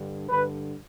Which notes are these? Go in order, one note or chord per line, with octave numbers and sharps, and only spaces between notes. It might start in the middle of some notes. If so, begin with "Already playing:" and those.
Already playing: G2 D3
G2 D3 B4